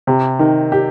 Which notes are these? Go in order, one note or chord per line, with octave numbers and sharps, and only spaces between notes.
C3
D#3
G4